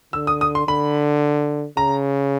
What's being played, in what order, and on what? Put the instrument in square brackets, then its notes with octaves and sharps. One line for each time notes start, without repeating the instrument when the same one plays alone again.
[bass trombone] D3 [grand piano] E6
[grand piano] D#6
D#6
C6
[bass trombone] D3 [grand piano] B5
[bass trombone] C#3 [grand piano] A#5